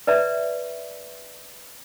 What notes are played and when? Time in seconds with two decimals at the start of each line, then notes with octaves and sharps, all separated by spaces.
0.07 B4 D5 E5 A#5